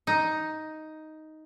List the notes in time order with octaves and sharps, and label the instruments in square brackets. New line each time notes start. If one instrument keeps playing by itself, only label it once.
[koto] D#4